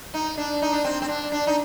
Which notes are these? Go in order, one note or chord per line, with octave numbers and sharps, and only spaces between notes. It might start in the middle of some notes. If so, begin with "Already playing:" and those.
D#4
D4
D#4
D4
C4
C4
D4
D4
D#4